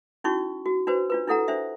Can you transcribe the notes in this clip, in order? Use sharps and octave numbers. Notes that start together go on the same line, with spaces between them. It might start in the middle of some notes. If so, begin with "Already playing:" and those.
C#4 D#4 E4 F#4 C#6
F#4
D4 F#4 B4 C5
D4 F4 B4
D4 E4 A4 F#5 A#5
D4 C5 E5